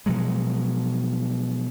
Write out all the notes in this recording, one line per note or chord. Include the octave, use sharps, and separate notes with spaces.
B2 F3 F#3 G#3